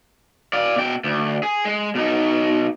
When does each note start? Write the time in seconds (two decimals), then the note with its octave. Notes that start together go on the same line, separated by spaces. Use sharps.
0.53 D5 F5
0.76 B2 G5
1.04 D2
1.43 G#4
1.65 G#3
1.95 B2 D#4